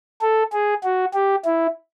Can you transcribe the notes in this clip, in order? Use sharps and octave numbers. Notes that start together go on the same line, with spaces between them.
A4
G#4
F#4
G4
E4